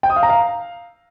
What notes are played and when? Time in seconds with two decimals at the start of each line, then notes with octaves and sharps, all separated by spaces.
0.03 G5
0.10 D#6
0.16 F5
0.23 A#5
0.29 F5